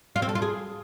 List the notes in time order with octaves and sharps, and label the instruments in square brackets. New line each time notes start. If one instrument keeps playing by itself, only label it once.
[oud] F4
C4
A4
F4
G#4